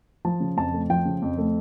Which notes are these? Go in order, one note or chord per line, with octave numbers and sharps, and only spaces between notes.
F3 A5
C#3
F2 A5
A3
F3 G5
C#3
F2
A3